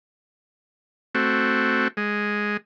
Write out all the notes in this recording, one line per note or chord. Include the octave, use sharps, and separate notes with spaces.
A3 C4 F#4
G#3